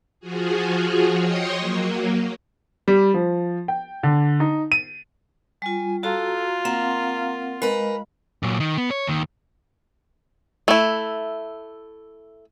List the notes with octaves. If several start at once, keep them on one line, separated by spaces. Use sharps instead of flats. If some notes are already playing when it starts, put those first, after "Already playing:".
F3 F4 F#4 G#4
C#5 D#5 G5 C6 C#6 D#6
F#3 A#3
G3
F3
G5
D3
D#4
D#7
G3 F4 G#5
F4 F#4 A4 A#5
A#3 C4 F#5 A#5
G#3 A#4 B4 D#5 B5
A#2 F#3
D#3
B3
C#5
D#2 D#3
A3 E4